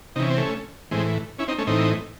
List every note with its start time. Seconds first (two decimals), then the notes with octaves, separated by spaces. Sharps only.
0.16 C3 D#4
0.19 E3 C#4
0.30 C4
0.37 A3 C#4
0.91 A2 E3 G#3 C4
1.39 C#4 E4
1.48 C4 D#4
1.58 A3 C#4
1.67 A2 E3 C4 D#4